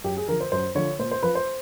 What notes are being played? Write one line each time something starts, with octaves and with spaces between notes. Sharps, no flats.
F#2 G4
G#4
D3 F3 A#4
C5
F#2 C5
D3 F3 C#5
A#2 C5
C5
F3 B4
C5